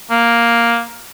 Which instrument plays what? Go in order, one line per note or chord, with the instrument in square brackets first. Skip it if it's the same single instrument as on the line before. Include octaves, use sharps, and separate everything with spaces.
[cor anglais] A#3